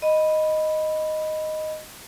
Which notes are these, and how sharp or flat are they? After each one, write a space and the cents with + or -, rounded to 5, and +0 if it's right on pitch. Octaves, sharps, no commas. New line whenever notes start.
D#5 +0 B5 +0